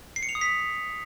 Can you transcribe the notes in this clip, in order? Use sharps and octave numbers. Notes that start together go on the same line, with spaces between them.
C7
C#7
F7
D#6
B6